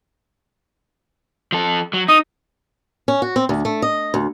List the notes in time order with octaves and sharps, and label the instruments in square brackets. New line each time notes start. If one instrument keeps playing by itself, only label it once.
[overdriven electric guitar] F3 A4
F#3
[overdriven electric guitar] D#4 [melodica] D#6
[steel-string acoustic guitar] C#4
F#4
C4
D2
A3
D#5
D2